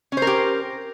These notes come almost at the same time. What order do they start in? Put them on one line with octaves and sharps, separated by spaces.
C#4 C5 A#4 G4